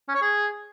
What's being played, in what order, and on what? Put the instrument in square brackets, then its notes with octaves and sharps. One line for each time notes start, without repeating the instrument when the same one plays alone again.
[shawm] C#4
C#5
G#4